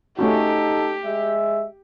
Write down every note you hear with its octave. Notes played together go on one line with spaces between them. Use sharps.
A3 C#4 D#4 F#4 G4 A4
G#3 E5